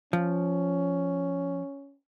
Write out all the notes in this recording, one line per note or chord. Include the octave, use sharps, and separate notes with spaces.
F3 C#4